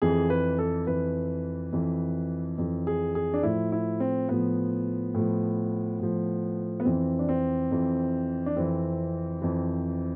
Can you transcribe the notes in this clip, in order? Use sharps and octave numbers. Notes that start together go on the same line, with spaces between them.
F2 E3 G#4
B4
A4
F2 E3 B4
F2 E3
F2 E3
G#4
G#4
D4
A2 F3 E4
E4
C4
A2 F3 B3
A2 F3
A2 F3
B3
F2 E3 C4
D4
C4
F2 E3
D4
F2 E3 C4
F2 E3